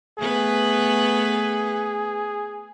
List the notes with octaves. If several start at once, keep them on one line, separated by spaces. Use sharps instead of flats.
A3 B3 G#4 B4